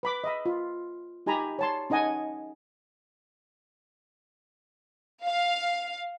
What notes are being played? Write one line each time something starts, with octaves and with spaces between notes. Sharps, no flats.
B4 B5 D6
D#5 E5 B5
F4
D#4 G4 G#5 A#5 B5
C#5 A5 C6
C#4 D#4 D#5 F#5 G#5
F5